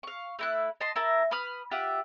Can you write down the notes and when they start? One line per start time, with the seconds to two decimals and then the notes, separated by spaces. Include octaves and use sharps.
0.03 F5 C#6
0.39 A3 E4 F#6
0.81 D#5 A5 C6
0.96 E4 A#4 A5
1.31 B4 B5 D#6 F6
1.71 F4 G4 E5 F#5